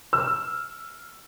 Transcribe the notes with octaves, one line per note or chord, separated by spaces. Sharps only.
E6 F6